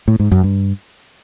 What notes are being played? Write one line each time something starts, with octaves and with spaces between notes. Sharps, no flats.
A2
G#2
F#2
G2